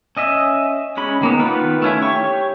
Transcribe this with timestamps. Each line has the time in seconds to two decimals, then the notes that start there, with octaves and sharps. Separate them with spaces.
0.17 C#4 D#5 E5
0.97 G#3 C#4 B5
1.21 D#3 A#3 B3
1.39 D#3 B3 F4 B4 B5
1.82 A3 C#4 E4
2.02 G4 C#5 C#6